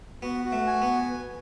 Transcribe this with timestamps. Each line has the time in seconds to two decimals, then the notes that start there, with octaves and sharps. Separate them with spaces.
0.22 B3 F#4
0.45 F#4
0.52 A3
0.67 G#5
0.82 B3